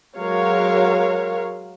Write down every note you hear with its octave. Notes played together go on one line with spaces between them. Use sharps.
F#3 G#3 A#4 C#5 F5